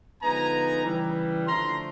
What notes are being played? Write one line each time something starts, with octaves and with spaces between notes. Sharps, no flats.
D3 F3 G#3 B3 D#4 G#5 A#5
C#3 E3 G3
D3 F3 A3 D4 A#5 C6